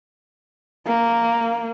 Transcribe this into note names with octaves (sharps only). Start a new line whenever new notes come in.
A#3